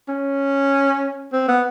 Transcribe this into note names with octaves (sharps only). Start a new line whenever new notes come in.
C#4
C4
B3